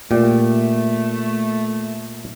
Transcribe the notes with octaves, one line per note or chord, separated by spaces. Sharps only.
A#2 A3 G4